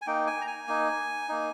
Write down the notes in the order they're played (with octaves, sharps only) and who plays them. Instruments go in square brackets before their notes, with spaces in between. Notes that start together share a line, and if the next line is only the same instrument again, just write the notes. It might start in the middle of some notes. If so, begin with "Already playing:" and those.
[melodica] G#5
A#3 D#4 G5
G#5
A#5
G#5
A#3 D#4
A#3 D#4